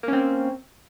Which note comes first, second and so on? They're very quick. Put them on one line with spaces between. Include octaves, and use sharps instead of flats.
A#3 C#4 C4